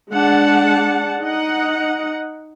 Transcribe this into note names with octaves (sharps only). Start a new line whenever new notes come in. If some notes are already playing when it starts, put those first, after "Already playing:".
G#3 D4 F#5 A5
D#4 D#5 F#5